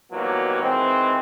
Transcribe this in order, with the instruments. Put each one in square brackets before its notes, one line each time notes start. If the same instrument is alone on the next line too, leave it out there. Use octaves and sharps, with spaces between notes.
[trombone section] G#2 B2 E3 F#3 G3 A#3
D#3 E3 G#3 C4